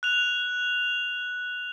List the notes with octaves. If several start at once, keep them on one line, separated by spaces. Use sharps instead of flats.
F#6 F7